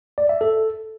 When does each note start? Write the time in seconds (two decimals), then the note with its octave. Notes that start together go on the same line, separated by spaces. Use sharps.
0.18 D5
0.29 E5
0.41 A4